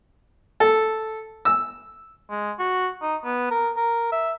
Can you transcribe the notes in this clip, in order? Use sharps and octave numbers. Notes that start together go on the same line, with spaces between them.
A4
E6
G#3
F#4
D#4
B3
A#4
A#4
E5